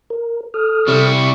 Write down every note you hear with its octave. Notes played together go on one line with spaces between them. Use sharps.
A#4
A4 D#6 F6
C3 G3 E4 C#6